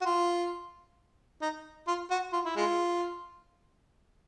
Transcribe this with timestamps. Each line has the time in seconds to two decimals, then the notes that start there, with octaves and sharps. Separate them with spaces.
0.01 F#4
0.05 F4
1.42 D#4
1.87 F4
2.10 F#4
2.33 F4
2.45 E4
2.56 G#3 F4